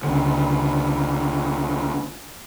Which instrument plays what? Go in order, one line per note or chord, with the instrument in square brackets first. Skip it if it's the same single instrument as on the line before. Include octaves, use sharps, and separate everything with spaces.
[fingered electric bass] C#2 D3